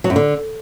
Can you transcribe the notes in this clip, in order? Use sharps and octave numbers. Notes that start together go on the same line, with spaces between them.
F#3
F#2
D3